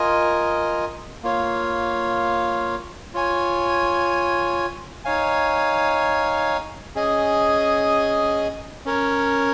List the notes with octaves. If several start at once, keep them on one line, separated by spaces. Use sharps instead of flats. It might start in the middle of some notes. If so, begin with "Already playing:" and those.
Already playing: F4 A#4 D#5 G#5
A#3 F4 C#5 F5
F4 C#5 G#5
D#4 C#5 F5 G#5
C#4 G#4 D#5 G#5
C#4 A#4 C#5